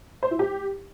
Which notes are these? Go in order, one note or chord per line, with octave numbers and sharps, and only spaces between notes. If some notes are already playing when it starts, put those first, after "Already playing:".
C5
E4
G4